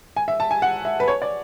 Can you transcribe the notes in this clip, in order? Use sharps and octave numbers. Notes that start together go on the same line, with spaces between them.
G#5
E5
A5
G#5
F#5
E5
B4
C#5
D5